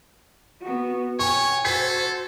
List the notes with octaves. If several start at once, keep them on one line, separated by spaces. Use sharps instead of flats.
B3 F#4
C#5 G5 G#5 C#6
F#4 A4 C5 G#6 B6 C7